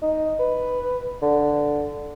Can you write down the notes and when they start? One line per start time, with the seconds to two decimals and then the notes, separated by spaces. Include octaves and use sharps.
0.02 D#4
0.39 B4
1.22 D3